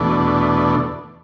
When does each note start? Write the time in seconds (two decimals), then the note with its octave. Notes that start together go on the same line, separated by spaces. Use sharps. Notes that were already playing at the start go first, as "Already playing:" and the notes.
Already playing: E2 B2 A3 D4